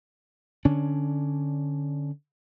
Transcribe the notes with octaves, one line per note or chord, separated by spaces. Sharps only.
D3 C#4 D4